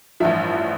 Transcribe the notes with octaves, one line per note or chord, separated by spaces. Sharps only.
A1 G2 F3 E5